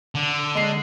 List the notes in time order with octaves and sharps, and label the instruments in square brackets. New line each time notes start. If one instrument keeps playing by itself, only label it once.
[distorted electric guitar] D3
[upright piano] G#3 C7